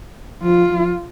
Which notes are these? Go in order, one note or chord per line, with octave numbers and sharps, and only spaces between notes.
F3 F4
F3